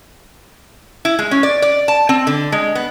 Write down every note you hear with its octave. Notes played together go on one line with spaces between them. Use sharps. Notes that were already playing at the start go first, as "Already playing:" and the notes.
E4
G#3
C#4
D5
D5
A5
C4
D3
G#3
B3